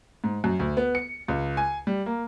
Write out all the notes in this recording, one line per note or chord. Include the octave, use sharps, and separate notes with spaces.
G#2
F#2
D2
B3
C#7
C#2
G#5
G3
A#3